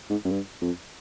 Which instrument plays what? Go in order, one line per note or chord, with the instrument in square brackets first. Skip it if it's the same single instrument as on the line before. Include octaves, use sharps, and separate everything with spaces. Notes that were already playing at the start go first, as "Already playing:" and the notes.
[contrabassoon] G#2
F#2
G2
F2